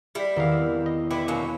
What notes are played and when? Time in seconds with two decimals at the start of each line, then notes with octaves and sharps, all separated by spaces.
0.15 G3 E4 G4 B6
0.36 E2 D#3 B3 C4 A#4 F5
0.52 E5
0.86 D#5
1.11 D3 E4 G4 B4
1.28 D2 B2 F#3 A#3 C#4